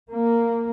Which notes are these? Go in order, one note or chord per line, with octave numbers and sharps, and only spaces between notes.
A#3